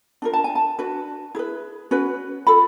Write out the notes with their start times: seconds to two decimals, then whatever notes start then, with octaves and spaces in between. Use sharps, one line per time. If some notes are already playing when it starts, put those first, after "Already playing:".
0.22 D4 F4 A#4
0.33 A5
0.44 G#5
0.55 A5
0.79 D4 F#4 B4
1.35 E4 G#4 B4
1.91 C#4 F#4 B4
2.47 F4 A4 B5